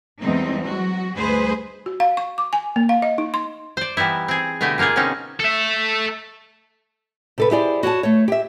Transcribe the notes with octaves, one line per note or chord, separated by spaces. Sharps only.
E2 G3 G#3 C4 D#4
F#3 F#4
D2 G2 G#3 G#4 B4 C5
F#4
F5
C#6
D6
G#5
A#3
F5
D#5
D#4
C6
C5 D5
E3 G3 B3 D#4 E4
C4 G#4
B2 D3 A3 G4 D#5 G#5
G#3 A#3 D#4 F4 G#4
B2 D3 C4 C#4 D#4
A4 E5
C3 A4 B4
E4 G4 G#4 C5 D5
F#4 C#5 G5 A5
A3 C#5
G4 E5